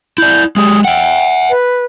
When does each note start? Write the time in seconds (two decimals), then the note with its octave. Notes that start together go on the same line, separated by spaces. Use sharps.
0.18 E4 D5 G6
0.57 G#3 G4 D#6
0.85 E5 F#5 G5
1.50 B4